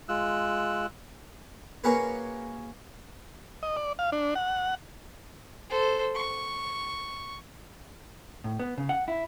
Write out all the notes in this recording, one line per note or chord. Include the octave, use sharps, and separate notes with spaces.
G#3 F4 E6 F#6
A#3 C#4 F#4 G#4 A#4 B4
D#5
D5
F5
D4
F#5
A4 C5
C#6
A2
B3
C#3
F#5
E4